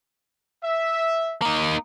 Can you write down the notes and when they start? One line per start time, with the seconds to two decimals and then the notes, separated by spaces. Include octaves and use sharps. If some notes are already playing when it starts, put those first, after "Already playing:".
0.64 E5
1.42 A#3 D#4